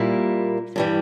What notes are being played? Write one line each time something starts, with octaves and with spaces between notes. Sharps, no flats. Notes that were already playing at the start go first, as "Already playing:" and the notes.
Already playing: A#2 G3 A#3 E4
G2 E3 G3